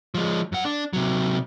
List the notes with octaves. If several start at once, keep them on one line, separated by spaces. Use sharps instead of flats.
F3 G#3
F#2 F#5
D4
C3 F#3